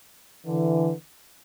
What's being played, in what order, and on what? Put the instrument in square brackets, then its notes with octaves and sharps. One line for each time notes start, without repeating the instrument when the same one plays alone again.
[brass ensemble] D3 E3